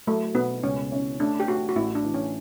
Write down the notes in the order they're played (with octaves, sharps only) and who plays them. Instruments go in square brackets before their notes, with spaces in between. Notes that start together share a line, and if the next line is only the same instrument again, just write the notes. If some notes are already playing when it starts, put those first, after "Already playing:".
[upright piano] F#3 [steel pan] A3
[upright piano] B2 [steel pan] B3
[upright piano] C#2 [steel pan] C#4
[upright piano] C#4
[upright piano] A3 [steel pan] D4
[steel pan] G4
[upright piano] A3 [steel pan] F#4
[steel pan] F#4
[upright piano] A1 [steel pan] E4
[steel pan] D4
[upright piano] E3
[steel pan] C#4